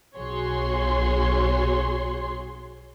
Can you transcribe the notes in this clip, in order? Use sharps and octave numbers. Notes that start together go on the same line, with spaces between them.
B1 F#4 G#4 C#5 C6